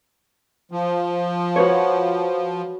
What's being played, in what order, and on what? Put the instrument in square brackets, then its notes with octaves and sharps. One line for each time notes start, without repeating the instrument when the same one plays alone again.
[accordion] F3
[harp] F#4 B4 C#5